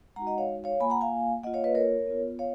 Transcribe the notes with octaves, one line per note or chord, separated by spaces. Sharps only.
G#3 D#4 F#4 F#5 A#5
D#5 F#5
C#5 F5
C#5 F5
A#3 F4 G#5 B5
F#5 A#5
F5 G#5
A#3 F4 D#5 F#5
C#5 F5
B4 D#5
A#4 C#5
B3 F4
C#5 F5